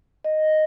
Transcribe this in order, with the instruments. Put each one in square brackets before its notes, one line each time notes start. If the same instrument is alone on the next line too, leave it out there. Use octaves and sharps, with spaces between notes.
[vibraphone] D#5